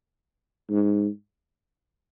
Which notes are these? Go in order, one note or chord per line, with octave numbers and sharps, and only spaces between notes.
G#2